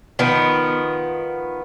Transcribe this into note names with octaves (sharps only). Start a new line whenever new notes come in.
D#3 F3 B3